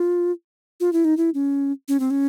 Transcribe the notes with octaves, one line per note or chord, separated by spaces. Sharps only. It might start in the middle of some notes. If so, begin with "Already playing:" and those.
Already playing: F4
F4
E4
D#4
E4
C#4
C#4
C4
C#4